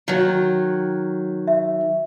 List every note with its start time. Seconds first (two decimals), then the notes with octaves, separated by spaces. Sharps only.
0.08 D#3 F#3
1.48 E5